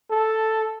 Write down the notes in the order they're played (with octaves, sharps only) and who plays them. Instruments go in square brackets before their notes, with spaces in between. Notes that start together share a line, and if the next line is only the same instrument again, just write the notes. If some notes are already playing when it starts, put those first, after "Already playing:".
[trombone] A4